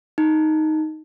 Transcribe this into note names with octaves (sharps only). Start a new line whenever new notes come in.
D#4